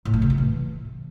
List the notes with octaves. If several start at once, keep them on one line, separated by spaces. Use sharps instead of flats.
A2
A3
C3
A3
E3